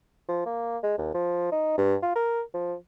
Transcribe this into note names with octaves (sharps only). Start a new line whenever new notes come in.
F3
A#3
G#3
D#2
F3
D#4
G2
F4
A#4
F3